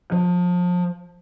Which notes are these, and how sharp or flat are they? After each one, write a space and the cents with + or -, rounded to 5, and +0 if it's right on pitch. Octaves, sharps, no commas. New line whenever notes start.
F3 +30